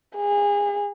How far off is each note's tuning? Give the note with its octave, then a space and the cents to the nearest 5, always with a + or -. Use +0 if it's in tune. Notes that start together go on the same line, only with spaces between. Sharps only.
G#4 -30